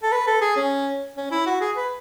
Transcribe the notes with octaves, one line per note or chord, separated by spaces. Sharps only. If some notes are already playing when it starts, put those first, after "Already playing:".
A4
B4
A4
G#4
C#4
C#4
E4
F#4
G#4
B4